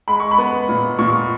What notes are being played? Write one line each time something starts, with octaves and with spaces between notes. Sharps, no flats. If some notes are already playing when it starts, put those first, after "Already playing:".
G#3 B5
C#6
B5
B3
A#2
A#2 C#6